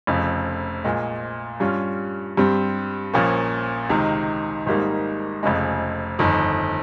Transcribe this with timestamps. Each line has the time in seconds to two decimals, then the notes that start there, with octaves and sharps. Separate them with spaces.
0.07 F1 F2 C#3
0.84 A#1 A#2 G#3
1.60 G2 G3 C#4 F4
2.37 G2 G3 C4
3.13 A#1 A#2 F3 A#3 C#4
3.89 C#2 C3 D#3
4.66 G#1 G#2 G3 A#3 D#4
5.43 F1 F2 C#3 G#3
6.19 G1 F2 D#3